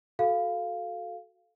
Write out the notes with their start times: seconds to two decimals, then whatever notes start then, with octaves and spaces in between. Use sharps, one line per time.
0.19 F#4 A4 F5